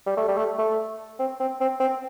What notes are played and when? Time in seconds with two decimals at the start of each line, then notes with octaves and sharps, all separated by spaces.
0.06 G3
0.17 A3
0.28 G3
0.37 A3
0.58 A3
1.20 C4
1.40 C4
1.61 C4
1.80 C4